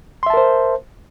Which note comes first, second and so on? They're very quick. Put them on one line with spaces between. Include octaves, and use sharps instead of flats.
C6 E5 A5 A#4 C5